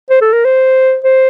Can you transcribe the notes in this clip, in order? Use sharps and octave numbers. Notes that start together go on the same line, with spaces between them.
C5
A4
A#4
C5
C5